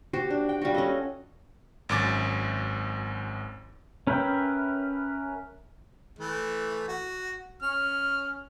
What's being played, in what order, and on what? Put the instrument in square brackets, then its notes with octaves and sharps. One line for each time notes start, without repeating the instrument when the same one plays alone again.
[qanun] F#4 G4 C5
D4
G5
G3 F4 F#4
C#4 A4 D#5
[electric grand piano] G#1 F#2 D6 A6
[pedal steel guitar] C#4 A#4 B4 E5 G5
[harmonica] E3 A3
F#4
C#4 F6